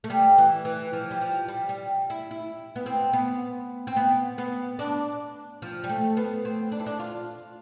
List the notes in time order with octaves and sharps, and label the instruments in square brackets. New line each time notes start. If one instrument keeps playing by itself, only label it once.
[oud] A3
G3
E3
E3
F3
G3
F3
G3
G3
E4
E4
B3
C4
B3
C4
B3
B3
D4
F3
G3
A3
B3
C4
D4
E4
D4
F4